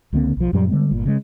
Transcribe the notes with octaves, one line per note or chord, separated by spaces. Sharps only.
C#2 D3 A#3 C4
B1 F3
F#2 A#2 F#3 G3
D3 G3 G#3 B3
G1 A#2
C#3 G#3